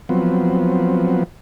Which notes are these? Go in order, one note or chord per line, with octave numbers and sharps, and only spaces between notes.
F3 F#3 B3 C4